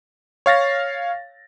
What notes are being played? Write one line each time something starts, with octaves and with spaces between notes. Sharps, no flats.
C#5 F5 A6 A#6